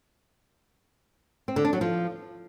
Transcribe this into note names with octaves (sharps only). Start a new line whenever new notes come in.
C4
D3
D4
F#3
F3